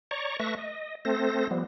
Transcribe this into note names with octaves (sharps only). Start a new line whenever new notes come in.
C#5 D5 A#5 C#6
A3 B4 E5 C#6 A#6
D#5
A3 C4 A4 C5 A#6
F3 G3 B3